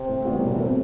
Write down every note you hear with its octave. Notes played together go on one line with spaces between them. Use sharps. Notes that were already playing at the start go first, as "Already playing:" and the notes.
Already playing: C3
A2
E3 G3 B3 F#4
F#2 B2
A2
A3 C4